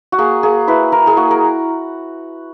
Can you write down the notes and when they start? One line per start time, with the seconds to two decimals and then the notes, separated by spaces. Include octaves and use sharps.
0.12 F#4
0.18 A#3 G#4
0.43 A#3 G#4
0.68 E4 B4
0.92 E4 A#4
1.07 G#4
1.17 A#3 F#4
1.31 A#4